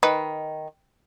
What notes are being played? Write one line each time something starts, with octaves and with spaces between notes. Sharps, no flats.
D#3 B4